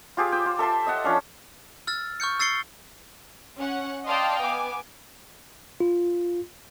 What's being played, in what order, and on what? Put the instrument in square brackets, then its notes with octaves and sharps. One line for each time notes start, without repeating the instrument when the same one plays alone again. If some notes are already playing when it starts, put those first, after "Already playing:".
[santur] F4 G4 G#4 D6
C5 G5
F4
A4 E5 A5 C6
D#5 E5 F#5
F3 C#4 D4 F5
[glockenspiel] E6 F6 A6
C#6 F6 G6 C#7
E6 A6 C7 C#7 G7
[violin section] C#4 F#5
D5 D#5 F5 G5 A5 C6
B3 G#5 D6
[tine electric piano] F4